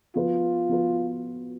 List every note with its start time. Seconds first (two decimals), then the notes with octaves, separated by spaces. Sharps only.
0.15 F3 B3 F4 F#4 B4
0.69 F3 B3 F#4 B4